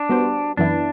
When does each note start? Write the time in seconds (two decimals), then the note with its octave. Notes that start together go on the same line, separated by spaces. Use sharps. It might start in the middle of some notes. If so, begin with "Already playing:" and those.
Already playing: D4
0.09 G3 B3 F#4 C5
0.57 F#2 E3 B3 D4 E4